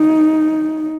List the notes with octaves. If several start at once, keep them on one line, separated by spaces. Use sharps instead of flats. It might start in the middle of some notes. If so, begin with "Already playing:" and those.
Already playing: D#4